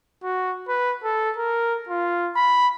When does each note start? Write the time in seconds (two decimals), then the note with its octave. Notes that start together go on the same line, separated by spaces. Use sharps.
0.23 F#4
0.68 B4
1.04 A4
1.37 A#4
1.89 F4
2.36 B5